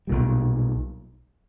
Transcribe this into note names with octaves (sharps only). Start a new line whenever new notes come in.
B1 A#2 G3